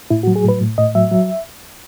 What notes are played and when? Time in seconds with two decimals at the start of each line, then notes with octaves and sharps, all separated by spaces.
0.10 A2 E4
0.23 F#4
0.27 F#3
0.36 G#4
0.44 A2 B4
0.61 A2
0.78 A2 D#5
0.95 F#3 E5
1.12 F#3